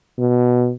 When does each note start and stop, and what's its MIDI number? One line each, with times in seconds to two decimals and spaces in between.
0.19 0.72 47